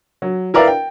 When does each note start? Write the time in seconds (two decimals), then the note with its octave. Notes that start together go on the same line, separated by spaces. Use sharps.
0.22 F#3
0.54 E4 A#4 B4 D5 E5 F5
0.67 G5